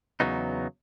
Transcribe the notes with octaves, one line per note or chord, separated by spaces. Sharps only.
E2 A#2 C#3 F#3 B3 D#4